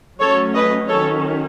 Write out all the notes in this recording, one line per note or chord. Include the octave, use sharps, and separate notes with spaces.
F#3 A3 C#4 A4 C#5
B4 D#5
D#3 F#3 C#4 A4 C#5